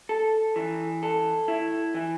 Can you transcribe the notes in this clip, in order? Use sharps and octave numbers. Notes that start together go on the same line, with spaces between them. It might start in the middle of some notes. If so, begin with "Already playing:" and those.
A4
E3
A4
E4
E3